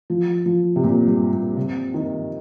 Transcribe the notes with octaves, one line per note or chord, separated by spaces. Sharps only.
F3
F3
C3
A#2
G2
A#2
C3
D#3